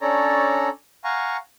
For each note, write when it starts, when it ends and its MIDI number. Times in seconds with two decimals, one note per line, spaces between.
0.01 0.69 61
0.01 0.69 62
0.01 0.69 69
0.01 0.69 73
0.01 0.69 74
0.01 0.69 82
1.04 1.37 77
1.04 1.37 78
1.04 1.37 80
1.04 1.37 82
1.04 1.37 85